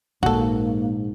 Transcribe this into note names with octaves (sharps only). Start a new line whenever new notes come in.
A#1 G#2 A#3 F#4 A4